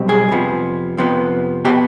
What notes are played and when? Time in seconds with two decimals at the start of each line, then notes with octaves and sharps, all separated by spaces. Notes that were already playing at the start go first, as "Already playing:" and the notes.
Already playing: B1 B2 G3 C4
0.09 G#4
0.31 F2 C3 F3 B3
0.97 F2 C3 F3 B3
1.65 B2 B3 G4